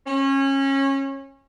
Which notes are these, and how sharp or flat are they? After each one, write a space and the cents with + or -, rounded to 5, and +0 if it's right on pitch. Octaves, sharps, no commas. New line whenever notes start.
C#4 -25